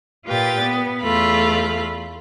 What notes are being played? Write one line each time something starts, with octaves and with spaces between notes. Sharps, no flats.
A#2 F4 G4 B4 G5 A6
B3
E2 A3 F4 B5